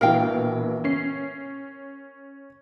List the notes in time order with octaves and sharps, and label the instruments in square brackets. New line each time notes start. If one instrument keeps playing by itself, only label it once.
[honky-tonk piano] A#1 B2 E3 [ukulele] A#4 F5 G5
[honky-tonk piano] C#4 C7